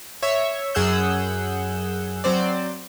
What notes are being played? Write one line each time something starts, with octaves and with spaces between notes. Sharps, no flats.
C#5 E5
F#2 G#4 F#5 E6 G6
F#3 C4 C5 D5